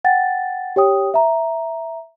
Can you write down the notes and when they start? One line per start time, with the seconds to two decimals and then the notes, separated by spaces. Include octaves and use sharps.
0.05 F#5 G5 A6
0.76 G4 C#5 G5 D#6
1.14 E5 A#5